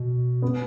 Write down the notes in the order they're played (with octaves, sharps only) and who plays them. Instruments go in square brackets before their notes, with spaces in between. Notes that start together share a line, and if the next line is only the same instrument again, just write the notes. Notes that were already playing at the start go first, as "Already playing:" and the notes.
Already playing: [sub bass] B2
[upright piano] B3